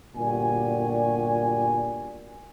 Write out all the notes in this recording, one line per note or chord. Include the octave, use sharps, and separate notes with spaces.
G1 A#2 F#4 G4 D5 G#5